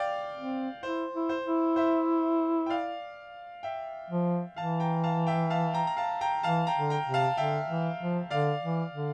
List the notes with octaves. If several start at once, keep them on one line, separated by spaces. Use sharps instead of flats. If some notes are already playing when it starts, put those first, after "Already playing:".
Already playing: D5 F5 G5
C4
E4 C5
E4
C5
E4
C5 E5
G5
D5 F5
E5 G5
F3
E3 F5 A5
G5 A#5
F5 A5
E5 G5
F5 A5
G5 A#5
A#5
F5 A5
G5 A#5
E3 F5 A5
G5 A#5
D3
G5 A#5
C3
F5 A5
D3 E5 G5
E3
F3
D3 D5 F5
E3
D3